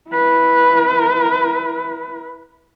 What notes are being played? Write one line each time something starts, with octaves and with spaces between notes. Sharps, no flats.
E4 B4